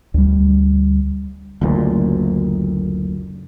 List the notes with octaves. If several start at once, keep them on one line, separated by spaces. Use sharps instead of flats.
D2 G3
F#1 D2 A#2